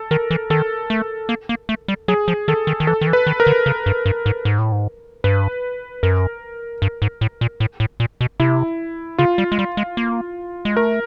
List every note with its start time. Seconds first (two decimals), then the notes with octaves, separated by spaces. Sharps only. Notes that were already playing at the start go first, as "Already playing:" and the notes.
Already playing: A4
0.11 D#3 A#4
0.31 E3
0.50 D#3 A4
0.90 A3
1.29 A#3
1.49 A#3
1.69 A3
1.88 G3
2.08 F#3 G#4
2.28 F3
2.48 D#3 A4
2.67 D#3
2.80 D#3
2.87 E3 A4
3.01 D#3
3.07 E3
3.13 B4
3.27 D#3
3.40 A#4
3.47 D3
3.66 C#3
3.86 G2
4.06 G2
4.26 G#2
4.45 G#2
4.59 A2
4.72 G#2
5.24 G2 B4
6.03 F#2 A#4
6.82 G2
7.02 G#2
7.21 A2
7.41 A#2
7.60 A2
7.80 A2
8.00 A#2
8.21 B2
8.40 C3 E4
9.18 C#3 F4
9.38 G3
9.52 G#3
9.59 G3
9.77 G#3
9.97 A#3
10.65 G#3
10.76 A3 A#4